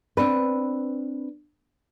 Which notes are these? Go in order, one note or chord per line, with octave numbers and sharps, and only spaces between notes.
C4 D4 B4